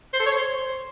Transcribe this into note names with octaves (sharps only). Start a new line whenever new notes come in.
C5
A4
C#5
C5